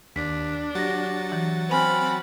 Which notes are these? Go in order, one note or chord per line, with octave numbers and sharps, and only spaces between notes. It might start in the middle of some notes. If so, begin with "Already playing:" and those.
D#2 D4 B6
F#3 G4 F#5 A6 A#6
E3
C4 C5 G#5 B5 F6